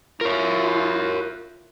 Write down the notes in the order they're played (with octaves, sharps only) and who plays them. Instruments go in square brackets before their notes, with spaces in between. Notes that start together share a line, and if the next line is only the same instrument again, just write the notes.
[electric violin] E4 F4 [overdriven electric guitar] A#4 C#5